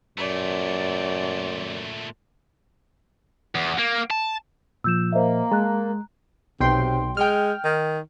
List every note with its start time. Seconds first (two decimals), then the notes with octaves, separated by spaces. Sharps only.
0.18 F#2 A#2 A3 D5
3.55 E2
3.78 A#3
4.10 A5
4.84 A#2 F3 E6 G6 E7
5.12 A#3 C5 D#5 E5
5.52 G#3 A5 A#5 F#6
6.60 B1 C3 G5 C6
7.17 G#3 G5 F6
7.65 D#3